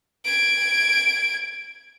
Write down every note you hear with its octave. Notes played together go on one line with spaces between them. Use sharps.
G#6 D7